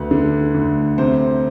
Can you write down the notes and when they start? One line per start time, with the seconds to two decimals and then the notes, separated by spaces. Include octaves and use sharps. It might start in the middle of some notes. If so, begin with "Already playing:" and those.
Already playing: D2 D3 B4
0.11 D3
0.55 D2
0.98 C3 C5